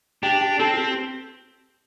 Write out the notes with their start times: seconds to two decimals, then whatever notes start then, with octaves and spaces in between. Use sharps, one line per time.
0.23 D4 G4
0.41 G4
0.59 C4 A4
0.74 F4
0.78 G4